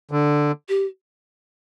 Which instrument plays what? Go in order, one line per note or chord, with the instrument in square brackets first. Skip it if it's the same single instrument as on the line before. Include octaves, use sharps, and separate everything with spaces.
[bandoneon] D3
[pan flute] G4